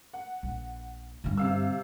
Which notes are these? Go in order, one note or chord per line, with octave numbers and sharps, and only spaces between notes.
F#5
A#1
G2 D3
C3 F5 E6